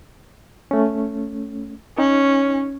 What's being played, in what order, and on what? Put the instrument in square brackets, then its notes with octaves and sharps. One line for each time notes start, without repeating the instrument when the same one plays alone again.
[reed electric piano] A3 C#4
[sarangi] C#4 [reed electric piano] D#4